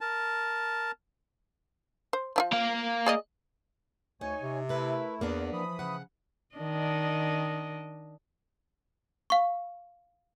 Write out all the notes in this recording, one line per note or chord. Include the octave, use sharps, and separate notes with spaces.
A#4 A5
C5
F3 E4 F4
A#3 F5
G#4 D5 D#5
D2 D#4 C#5 G#5
C3
A3 E4 A#4 B4 E5
E2 A#3 B3 D4
E3 F3 B5 D#6
C#3 F#5
D#3 D4 D#5
F5 C#6